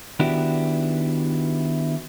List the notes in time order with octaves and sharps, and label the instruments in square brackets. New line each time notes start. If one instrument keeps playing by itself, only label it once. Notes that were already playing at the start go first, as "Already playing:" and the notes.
[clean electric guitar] D#3 B3 D4 E4 F#4 G4